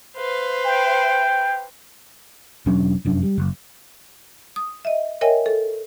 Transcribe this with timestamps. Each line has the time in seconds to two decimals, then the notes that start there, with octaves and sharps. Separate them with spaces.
0.17 B4 C5 F5
0.65 G5
2.66 E1 F#3 C#4 D4
3.05 F1 F#2 D4
3.23 G3
3.38 F#1
4.56 D#6
4.85 D#5 E5
5.21 A#4 C#5 D#5 E5 G5 G#5
5.46 A4